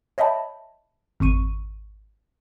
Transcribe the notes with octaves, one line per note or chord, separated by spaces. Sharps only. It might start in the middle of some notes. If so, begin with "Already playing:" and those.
C#5 D#5 E5 G5 A5 B5
G#1 F2 C#6 D#7